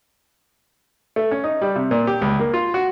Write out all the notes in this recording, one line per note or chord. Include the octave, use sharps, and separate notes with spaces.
A3
C#4
D#4
G3
C3
A#2
G4
C#2
A#3
F4
F#4